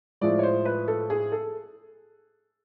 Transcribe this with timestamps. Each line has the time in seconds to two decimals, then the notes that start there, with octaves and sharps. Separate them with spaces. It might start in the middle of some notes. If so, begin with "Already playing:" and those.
0.21 A2 F3 G#3 D5
0.39 C#5
0.43 C5
0.65 B4
0.88 A4
1.10 G#4
1.32 A4